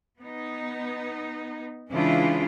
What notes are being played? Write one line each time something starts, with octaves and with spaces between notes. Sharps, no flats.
B3 D#4
C#3 E3 G#3 D4 E4 F4